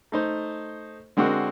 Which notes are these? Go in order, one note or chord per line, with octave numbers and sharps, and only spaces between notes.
A3 D#4 C5
D3 G#3 C4 D4 F#4 A#4